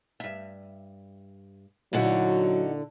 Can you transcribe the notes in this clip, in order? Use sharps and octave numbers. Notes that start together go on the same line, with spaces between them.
G2 E5
A#2 D3 F#3 D#4 E4 F#4